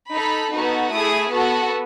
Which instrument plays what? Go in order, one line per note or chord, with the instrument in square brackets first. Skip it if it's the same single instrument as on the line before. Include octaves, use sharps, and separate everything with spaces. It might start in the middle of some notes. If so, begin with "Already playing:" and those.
[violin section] D#4 A4 B5
B3 D#4 F#4 A4
A3 E4 G#4 D#6
B3 F#4 A4